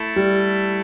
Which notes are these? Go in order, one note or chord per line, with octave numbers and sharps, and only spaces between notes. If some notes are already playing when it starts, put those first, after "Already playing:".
Already playing: A3 E4 A4
G3